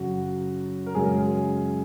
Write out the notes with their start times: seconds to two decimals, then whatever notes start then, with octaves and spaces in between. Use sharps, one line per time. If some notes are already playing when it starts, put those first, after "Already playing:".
Already playing: F#2 C#3 F#3 F#4
0.86 A#4
0.95 F#2 C#3 G#3 G#4